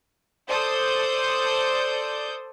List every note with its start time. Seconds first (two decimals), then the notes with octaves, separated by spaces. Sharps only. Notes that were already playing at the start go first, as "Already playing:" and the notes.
0.48 A4 C5 D5 D#6 G6